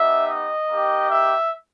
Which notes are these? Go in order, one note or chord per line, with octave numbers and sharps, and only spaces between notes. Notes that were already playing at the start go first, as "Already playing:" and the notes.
Already playing: B3 D#4 G4 E5
D#5
A#3 D#4 G4
E5